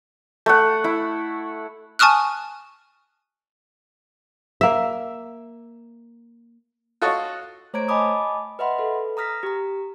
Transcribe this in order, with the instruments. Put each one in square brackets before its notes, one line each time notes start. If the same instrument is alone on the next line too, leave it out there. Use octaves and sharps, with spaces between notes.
[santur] A3 F#5
E4
[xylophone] G#5 A5 C#6 D#6 F6 F#6
[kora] A#3 E5
[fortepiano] F4 F#4 A4 C#5 D#5 C#6
[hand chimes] A3 C5 C#5 A#5 G#6 D7
D#5 G#5 A5 B5 D6 D#6
B4 D#5 E5 F#5 B5 C6
A4 B4
A#5 D#6 F6 A#6 B6
G4 A#5